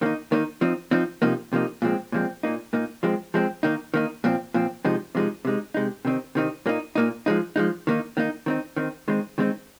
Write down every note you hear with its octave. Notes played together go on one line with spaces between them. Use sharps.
D#3 A#3 D#4
D#3 A#3 D#4
F3 C4 D#4
F3 C4 D#4
C3 F3 A#3 D#4
C3 F3 A#3 D#4
A#2 F3 G#3 C4
A#2 F3 G#3 C4
A#2 A#3 D#4
A#2 A#3 D#4
F3 G#3 C4
F3 G#3 C4
D#3 A#3 D#4
D#3 A#3 D#4
A#2 F3 C4
A#2 F3 C4
C3 F3 G#3 D#4
C3 F3 G#3 D#4
C3 G#3 D#4
C3 G#3 D#4
C3 D#3 C4 D#4
C3 D#3 C4 D#4
A#2 A#3 D#4
A#2 A#3 D#4
F3 G#3 D#4
F3 G#3 D#4
D#3 A#3 D#4
D#3 A#3 D#4
D#3 C4 D#4
D#3 C4 D#4
D#3 G#3 C4 D#4
D#3 G#3 C4 D#4